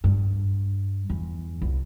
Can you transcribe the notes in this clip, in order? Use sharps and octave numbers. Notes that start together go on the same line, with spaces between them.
G2
E2
C2